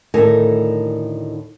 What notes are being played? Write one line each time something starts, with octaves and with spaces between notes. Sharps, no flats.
D2 A2 D#3 A4 A#4 G#5